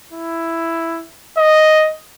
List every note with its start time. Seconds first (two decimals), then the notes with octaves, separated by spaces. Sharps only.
0.13 E4
1.38 D#5